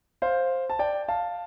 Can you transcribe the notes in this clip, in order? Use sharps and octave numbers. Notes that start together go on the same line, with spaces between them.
C5 F5
A5
D5 G5
F5 A5